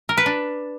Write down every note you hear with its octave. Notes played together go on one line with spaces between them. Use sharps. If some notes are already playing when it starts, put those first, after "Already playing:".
A#4
B4
D4